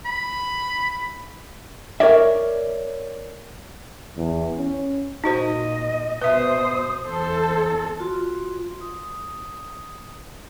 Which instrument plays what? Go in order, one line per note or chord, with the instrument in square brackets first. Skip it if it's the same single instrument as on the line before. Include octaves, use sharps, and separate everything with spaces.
[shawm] B5
[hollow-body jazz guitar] A#4 C#5 D5 E5
[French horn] E2
C#4
[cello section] A#2 [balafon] D#4 F#4 C5 [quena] D#5
[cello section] B2 C5 [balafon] B4 E5 [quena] D#6
[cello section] E2 A4 [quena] C5
[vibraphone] F4 F#4 C6
D#6